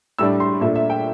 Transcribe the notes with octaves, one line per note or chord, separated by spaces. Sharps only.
A2 G3 D4 E6
C6
A#2 A3 D4 E5
E5
G5